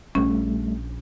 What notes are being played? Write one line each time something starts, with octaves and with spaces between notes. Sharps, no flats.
A#1 G3 A3 C#4